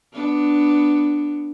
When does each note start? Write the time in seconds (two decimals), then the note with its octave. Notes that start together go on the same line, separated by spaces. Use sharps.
0.13 B3 D4